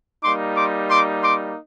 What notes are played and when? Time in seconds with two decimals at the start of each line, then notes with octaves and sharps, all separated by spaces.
0.22 G3 A#3 D#4 C6 D6
0.56 C6 D6
0.90 C6 D6
1.24 C6 D6